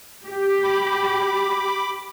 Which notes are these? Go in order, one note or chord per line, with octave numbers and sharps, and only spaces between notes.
G4
B5 D6